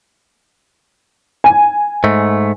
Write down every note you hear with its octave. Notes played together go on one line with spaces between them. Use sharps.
G#5
G#2 A3